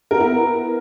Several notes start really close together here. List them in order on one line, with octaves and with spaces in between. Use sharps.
A#4 B3 E4